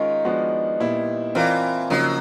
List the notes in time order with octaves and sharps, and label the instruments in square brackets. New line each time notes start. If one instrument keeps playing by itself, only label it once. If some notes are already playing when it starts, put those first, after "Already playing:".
Already playing: [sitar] D#3 [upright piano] G#3 C#4 F4 A#4
[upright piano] F3 G#3 B3 D4 F#4
A#2 G3 B3 E4
[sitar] E3 [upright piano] C4 F4 A#4 D5 F5
[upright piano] C#3 F3 A#3 D#4 [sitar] F#3